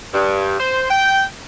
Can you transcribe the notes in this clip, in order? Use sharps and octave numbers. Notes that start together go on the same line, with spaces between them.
G2
C5
G5